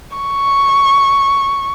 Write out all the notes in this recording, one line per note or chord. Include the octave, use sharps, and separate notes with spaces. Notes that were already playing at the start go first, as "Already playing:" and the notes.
C#6